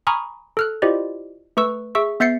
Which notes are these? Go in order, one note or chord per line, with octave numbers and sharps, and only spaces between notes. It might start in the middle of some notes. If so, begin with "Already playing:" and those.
G#5 A#5 B5 C#6 D#6 F6
A4 F6 F#6
E4 F4 G4 C5 D5 D#5
A3 B4 C#6 E6
G#4 E5 C#6 E6
B3 E5 G6 A6 C7 C#7